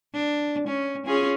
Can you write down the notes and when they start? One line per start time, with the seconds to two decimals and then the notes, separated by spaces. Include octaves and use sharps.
0.14 D4
0.68 C#4
1.06 C#4 F4 G#4